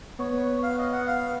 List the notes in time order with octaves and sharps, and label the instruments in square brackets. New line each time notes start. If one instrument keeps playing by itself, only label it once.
[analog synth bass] B3 [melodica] C#5
[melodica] F5
D#5
F#5
F5